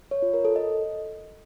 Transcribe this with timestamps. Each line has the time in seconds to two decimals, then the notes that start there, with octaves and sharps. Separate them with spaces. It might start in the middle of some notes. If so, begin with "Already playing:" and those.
0.11 C#5
0.22 F4
0.34 A#4
0.45 A4
0.56 D#5